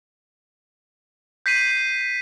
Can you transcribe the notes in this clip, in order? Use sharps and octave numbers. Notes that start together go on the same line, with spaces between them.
G6 B6 C7 D#7